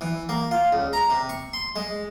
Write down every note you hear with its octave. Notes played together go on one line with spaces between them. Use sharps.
E3
A#3
F4
C#2
A#5
C3
C#6
C6
G#3